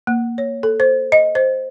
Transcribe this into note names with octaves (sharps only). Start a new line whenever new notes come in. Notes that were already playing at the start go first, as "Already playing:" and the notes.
A#3
C#5
A4
C5
D#5
C5